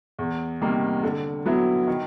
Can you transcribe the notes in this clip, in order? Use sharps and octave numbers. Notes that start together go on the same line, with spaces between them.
E2
C3 D#3 G3 A#3
D3
F#3 B3 E4
D#3